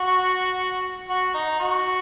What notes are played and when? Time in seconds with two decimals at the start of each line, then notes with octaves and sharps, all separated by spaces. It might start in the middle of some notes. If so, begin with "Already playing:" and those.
Already playing: F#4
1.09 F#4
1.34 D#4
1.59 F#4